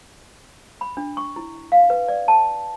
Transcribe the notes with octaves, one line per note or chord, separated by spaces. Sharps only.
B5
D4
C#6
E4
F5
B4
D5
A5